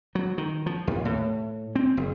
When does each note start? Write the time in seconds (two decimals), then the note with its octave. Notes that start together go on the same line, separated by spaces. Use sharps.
0.15 F#3
0.38 D#3
0.66 F3
0.87 D#2
1.05 A2
1.76 C4
1.97 F#1